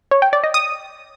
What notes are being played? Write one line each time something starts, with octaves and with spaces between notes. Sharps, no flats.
C#5
G5
D5
D#5
D#6